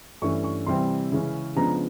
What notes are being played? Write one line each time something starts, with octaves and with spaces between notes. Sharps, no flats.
G2 E3 A3 C#4 C#6
C#6
C3 E3 G3 C4 C6
C#3 E3 G#3 C#4
C#3 F3 G#3 B3 D4 A#5